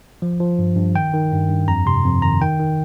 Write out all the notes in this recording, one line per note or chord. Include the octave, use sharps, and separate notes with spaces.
F3
F3
G2
G2
D#3 G5
D#3
G2
G2
F2 A#5
C3 C6
F2
D#3 A#5
D#3 G5
D#3